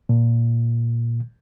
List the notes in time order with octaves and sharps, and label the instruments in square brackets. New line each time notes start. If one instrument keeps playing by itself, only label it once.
[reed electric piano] A#2